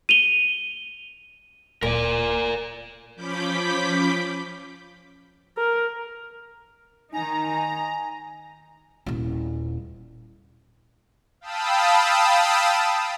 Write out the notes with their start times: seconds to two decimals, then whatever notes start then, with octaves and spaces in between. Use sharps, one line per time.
0.09 D#7 F7 G7
1.83 D1 A#2 A#4 D5
3.16 F3 C#4 B5 D6 G6 B6
5.58 A#4
7.14 D#3 D#4 G#5 A#5
9.06 D#1 E4
11.41 F5 G5 A5 B5 D#6 E6